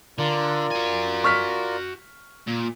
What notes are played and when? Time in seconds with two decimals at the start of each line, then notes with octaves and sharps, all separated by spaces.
0.19 D3 F4 A#4 D5
0.71 F#4 G#5
1.24 C#6 F6 B6
2.47 A#2